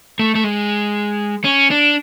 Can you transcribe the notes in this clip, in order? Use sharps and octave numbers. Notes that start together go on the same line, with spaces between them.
A3
A3
G#3
C#4
D4